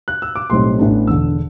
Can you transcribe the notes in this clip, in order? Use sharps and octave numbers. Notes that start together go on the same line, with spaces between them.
F#6
E6
D6
B1 A2 G3 C4 C6
A1 A2 E3 B3 D4
E1 E2 D3 E6